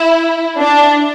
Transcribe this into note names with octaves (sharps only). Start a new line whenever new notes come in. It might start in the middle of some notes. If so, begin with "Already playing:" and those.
Already playing: E4
D4